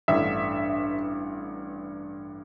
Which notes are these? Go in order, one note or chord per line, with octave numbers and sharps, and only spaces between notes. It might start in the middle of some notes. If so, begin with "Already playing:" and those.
A1 G2 D3 E5